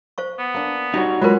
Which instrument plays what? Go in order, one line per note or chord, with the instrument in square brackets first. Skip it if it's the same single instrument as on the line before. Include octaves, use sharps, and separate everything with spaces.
[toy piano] C5 F5 C#6
[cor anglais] B3
[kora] A#3 D4
[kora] G3 [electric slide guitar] D#4 F#4 C#5
[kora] F#3 C#4 F#4 [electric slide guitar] G#3 [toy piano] F4 A#4 [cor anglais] B4